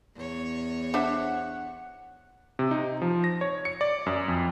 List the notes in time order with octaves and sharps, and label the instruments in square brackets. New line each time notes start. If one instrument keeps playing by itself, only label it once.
[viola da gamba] E2 C#5
[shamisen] D4 C5 E5 [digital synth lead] F#5
[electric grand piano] C3
D#4
F3
A#6
C#5
C#7
D5
F#2
F2